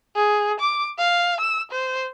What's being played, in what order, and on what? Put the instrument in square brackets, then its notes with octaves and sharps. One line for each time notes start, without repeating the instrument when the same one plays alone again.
[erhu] G#4
D6
F5
E6
C5